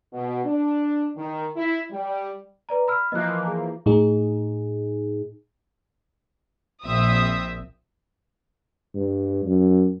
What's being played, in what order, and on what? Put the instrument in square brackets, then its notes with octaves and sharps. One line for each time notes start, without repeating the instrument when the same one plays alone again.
[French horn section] B2
D4
D#3
E4
G3
[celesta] B4 D5 A#5
B5 E6 F6
[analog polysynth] E3 F3 A#3 [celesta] D#5 F#6
[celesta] G#4
[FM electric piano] A2 D#4 G#4
[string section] A#1 C4 E5 D#6
[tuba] G2
F#2